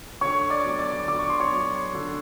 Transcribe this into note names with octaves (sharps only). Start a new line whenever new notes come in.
D3 C#5 C#6
D5 D6
F#3 B3
D5 D6
D3 D6
C#6
C6
C#5 C#6
F#3 B3
D3